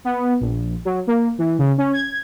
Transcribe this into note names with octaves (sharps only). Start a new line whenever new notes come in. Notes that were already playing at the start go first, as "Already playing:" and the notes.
B3
A#1
F#3
A#3
E3
C#3
C#4
G#6